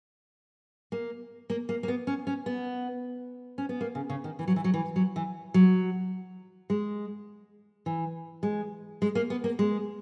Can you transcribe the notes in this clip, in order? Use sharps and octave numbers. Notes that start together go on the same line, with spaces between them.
A#3
A#3
A#3
A#3
B3
C#4
C#4
B3
C#4
B3
A#3
C#3
C#3
D#3
E3
F#3
E3
F#3
E3
F#3
E3
F#3
G#3
E3
G#3
G#3
A#3
B3
A#3
G#3